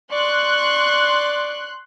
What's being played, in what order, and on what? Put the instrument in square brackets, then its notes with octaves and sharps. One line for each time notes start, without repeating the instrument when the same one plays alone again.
[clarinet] D5 [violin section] C6 F#6 [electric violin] C#6